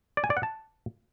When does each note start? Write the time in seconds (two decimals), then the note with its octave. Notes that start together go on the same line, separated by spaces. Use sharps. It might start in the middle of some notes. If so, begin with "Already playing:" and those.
0.17 D5
0.24 G#5
0.30 D5
0.37 F#5
0.43 A5